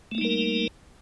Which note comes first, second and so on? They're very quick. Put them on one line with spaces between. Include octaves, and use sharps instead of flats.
A3 A#3 D#4 G3 A#4